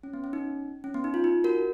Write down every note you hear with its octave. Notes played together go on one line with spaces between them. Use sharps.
C#4
B3
C#4
D#4
C#4
B3
D#4
F4
D#4
F#4 A#4